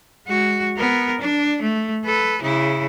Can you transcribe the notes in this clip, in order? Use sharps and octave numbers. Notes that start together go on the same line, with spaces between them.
G#3 F#4
B3 A#4
D4
A3
A4 B4
C#3 E4